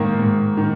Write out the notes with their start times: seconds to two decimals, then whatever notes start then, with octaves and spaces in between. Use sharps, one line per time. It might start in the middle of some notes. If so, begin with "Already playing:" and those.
Already playing: G#2 D#3 A#3
0.19 G#2
0.57 D#3